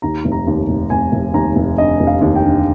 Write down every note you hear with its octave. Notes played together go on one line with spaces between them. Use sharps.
D#2 A#5
F1
A#5
D#2
F1
F1 G#5
F1
D#2 A#5
F1
D3 D#5
F1
F5
D#2
G5
D3